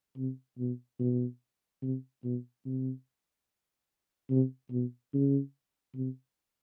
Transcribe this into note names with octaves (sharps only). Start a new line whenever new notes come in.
C3
B2
B2
C3
B2
C3
C3
B2
C#3
C3